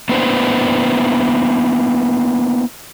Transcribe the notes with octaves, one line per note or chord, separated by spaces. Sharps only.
A#3 B3 D4 E4 B4 C5